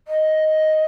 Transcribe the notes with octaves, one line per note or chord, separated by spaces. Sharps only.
D#5